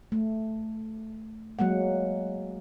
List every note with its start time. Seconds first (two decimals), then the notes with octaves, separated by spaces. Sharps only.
0.12 A3
1.59 F#3 G#3 A#3 F#5